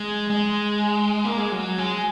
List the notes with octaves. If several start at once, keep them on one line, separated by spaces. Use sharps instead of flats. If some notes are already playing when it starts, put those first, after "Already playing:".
Already playing: G#3
G#3
A#3
G#3
F#3
G#3